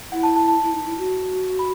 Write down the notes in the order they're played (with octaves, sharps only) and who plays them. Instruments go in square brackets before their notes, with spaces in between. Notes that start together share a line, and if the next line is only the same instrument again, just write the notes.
[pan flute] E4 [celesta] F#5
[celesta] A5
A5
A5
[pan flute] E4
D#4
E4
F#4
[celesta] B5